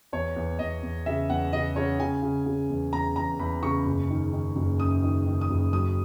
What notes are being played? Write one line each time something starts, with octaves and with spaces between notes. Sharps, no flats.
E2 C#5
E2
E2 D#5
E2
C#3 E5
E2 F#5
C#3 D#5
C#3 C#5
C#3 G#5
C#3
C#3
E2
E2 A#5
E2 A#5
E2 B5
C#3 C#6
F#1
D#3
D#3
F#1
F#2 D#6
D#3
D#3
D#6
F#1
F#3 D#6